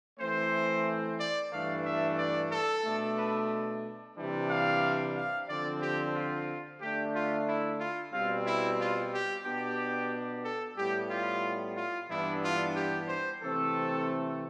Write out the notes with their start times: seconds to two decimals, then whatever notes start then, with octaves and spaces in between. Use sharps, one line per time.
0.20 E3 A3 C4 C5
1.19 D5
1.52 G2 E3 A3 D4 F5
1.85 E5
2.18 D5
2.51 A4
2.84 B2 A3 D4
3.18 B4
4.17 C3 E3 G3 D4
4.50 F5
5.16 F5
5.48 D3 F3 C4 D5
5.82 G4
6.15 F4
6.81 D3 A3 D4 G4
7.14 F4
7.47 E4
7.80 F4
8.13 B2 G3 C4 F4
8.46 E4
8.80 F4
9.12 G4
9.45 B2 B3 D4 G4
10.44 A4
10.77 A2 G3 B3 G4
11.10 F4
11.77 F4
12.09 G2 E3 B3 D4 E4
12.43 F4
12.76 G4
13.09 C5
13.42 C3 E3 A3 C4 A4